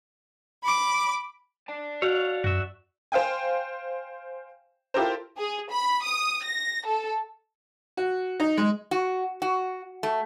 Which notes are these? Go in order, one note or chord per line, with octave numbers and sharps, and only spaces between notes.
B5 D6
D5 A5
F#4 C#5 F5 F#5
F#2 F#4 E5
C5 F5 G5 G#5
E4 F4 G4 A4 A#4 C5
G#4
B5
D#6
A#6
A4
F#4
D#4
G#3
F#4
F#4
A3